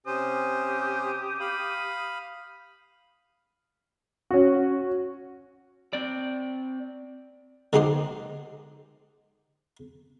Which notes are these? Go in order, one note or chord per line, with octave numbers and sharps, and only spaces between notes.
C3 C#4 G4 C5 D#6
F5 B5
C#4 F#4
C4 D5
D3 G#3 D#4 G4 C5